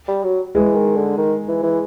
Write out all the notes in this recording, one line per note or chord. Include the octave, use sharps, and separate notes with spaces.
G3
F#3
E3 G#3
D#3
D3
D#3
E3
E3